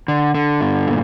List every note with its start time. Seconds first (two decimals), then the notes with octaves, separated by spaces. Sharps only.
0.08 D3
0.35 D3
0.61 G2
0.87 A#2